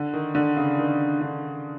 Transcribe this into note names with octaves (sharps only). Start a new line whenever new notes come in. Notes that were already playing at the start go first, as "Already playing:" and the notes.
Already playing: D3
D#3
D3
C#3
D#3
D3